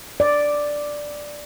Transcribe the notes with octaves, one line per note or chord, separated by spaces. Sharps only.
D5